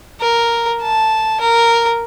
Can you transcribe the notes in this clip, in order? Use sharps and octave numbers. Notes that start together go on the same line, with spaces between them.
A#4
A5
A#4